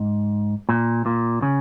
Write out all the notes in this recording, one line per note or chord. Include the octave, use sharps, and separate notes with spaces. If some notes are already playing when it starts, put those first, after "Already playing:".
Already playing: G#2
A#2
A#2
C#3